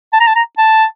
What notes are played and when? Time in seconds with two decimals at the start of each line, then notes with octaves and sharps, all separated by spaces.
0.13 A5
0.20 A#5
0.27 A5
0.35 A#5
0.58 A5